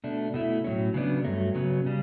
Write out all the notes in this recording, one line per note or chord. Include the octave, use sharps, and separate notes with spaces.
B2 A3 D4
B2 A3 E4
A2 F#3 C#4
C#3 F#3 B3 D4
G2 F#3 A3
C#3 F#3 B3
C#3 G3